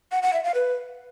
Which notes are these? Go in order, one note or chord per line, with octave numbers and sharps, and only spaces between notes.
F#5
F#5
E5
F5
B4